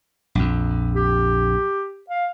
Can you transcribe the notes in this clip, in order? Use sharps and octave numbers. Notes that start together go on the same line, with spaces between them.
A#1 F2
G4
F5